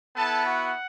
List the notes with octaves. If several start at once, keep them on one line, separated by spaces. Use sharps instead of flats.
B3 E4 A4 A5
F#4 F#5